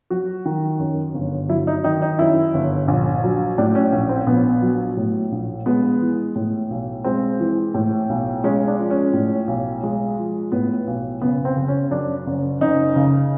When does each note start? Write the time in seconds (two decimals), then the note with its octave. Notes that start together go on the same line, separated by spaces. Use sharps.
0.10 F#3 F#4
0.45 D#3
0.79 F#2
1.14 G1
1.49 F#3 E4
1.67 D#4
1.84 D#3 D#4
2.02 D#4
2.19 F#2 E4
2.54 G1
2.88 A#1
3.24 F#3
3.58 A2 D4
3.75 C#4
3.92 A#1 C#4
4.09 C4
4.27 A#1 B3
4.62 F#3
4.97 A2
5.32 A#1
5.66 G#3 B3
6.01 E3
6.36 A2
6.70 B1
7.04 G#3 C4
7.40 E3
7.74 A2
8.09 B1
8.44 G#3 C#4
8.67 D4
8.79 F3
8.91 C#4
9.14 A2
9.48 B1
9.83 G#3
10.18 F3
10.52 A2 B3
10.87 B1
11.22 F#1 B3
11.45 C4
11.56 C#3
11.68 C#4
11.91 F#2 D4
12.26 F#1
12.61 F#1 D#4
12.96 C#3